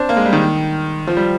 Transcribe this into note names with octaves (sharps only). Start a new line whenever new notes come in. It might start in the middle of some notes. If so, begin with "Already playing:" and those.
Already playing: C4 D4
A#3
G#3
G3
D#3
F3
G3